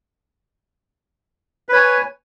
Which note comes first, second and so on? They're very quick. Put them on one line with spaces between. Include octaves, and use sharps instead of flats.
B4 C#5 G#5